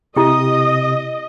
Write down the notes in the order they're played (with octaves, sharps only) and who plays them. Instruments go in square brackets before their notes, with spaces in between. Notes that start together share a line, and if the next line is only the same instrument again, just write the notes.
[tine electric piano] C3 [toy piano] E4 G4 [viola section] D#5 [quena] D#6